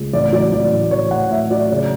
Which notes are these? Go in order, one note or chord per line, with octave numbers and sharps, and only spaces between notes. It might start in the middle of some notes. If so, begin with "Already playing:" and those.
Already playing: C#2
A1 D5
F#3 D5
A1 D5
A2
A1 C#5
A1 F#5
A2 E5
F#3 D5
C#3 C#5